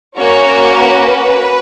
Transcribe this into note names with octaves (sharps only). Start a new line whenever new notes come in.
A#3 C#4 F#4 C#5
B4